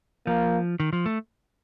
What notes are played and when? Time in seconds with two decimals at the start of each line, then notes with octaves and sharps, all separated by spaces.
0.27 F3 A#3
0.80 D#3
0.93 F3
1.06 A3